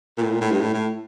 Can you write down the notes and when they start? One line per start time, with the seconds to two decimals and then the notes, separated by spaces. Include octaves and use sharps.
0.18 A#2
0.22 A2
0.31 A#2
0.41 A2
0.51 G2
0.61 A2
0.74 A2